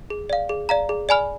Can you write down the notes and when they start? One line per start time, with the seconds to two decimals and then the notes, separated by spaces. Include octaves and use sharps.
0.10 G#4
0.30 D5 F5
0.49 G#4
0.69 D5 F5 A#5
0.89 G#4
1.09 D5 G#5 B5 F6